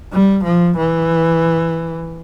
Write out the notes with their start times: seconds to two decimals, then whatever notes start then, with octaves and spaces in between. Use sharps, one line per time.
0.13 G3
0.44 F3
0.77 E3